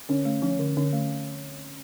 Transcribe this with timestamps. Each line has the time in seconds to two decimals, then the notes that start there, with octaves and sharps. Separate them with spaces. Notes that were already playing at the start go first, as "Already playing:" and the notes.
0.09 D3 C#4
0.25 A3
0.42 F3 C#4
0.59 D3
0.77 D3 C#4
0.93 A3